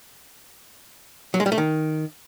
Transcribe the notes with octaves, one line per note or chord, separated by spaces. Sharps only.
F#3
G#3
G3
A3
D#3